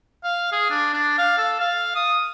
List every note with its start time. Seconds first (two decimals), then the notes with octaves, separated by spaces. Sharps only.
0.23 F5
0.52 G#4
0.70 D4
0.93 D4
1.18 F5
1.37 A4
1.60 F5
1.95 D#6